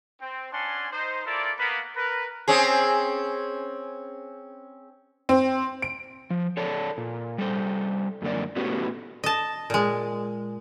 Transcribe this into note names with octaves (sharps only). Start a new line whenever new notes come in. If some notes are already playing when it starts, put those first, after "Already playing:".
C4
C#4 D4 F#5 G#5 A5 C6
D#4 C5
E4 F4 A4 A#4 D5
A#3 B3 B5
A#4 B4
C4 C#4 G#4
C4
D7
F3
A4 C#5 D5 A5
A#2
G3 A4 C5
F#2 D3 A#3 D5
A2 A3 B3 C#4 F#4 G4
D#5 A5
A#2 G#3